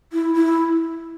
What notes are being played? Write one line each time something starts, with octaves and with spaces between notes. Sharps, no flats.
E4
E4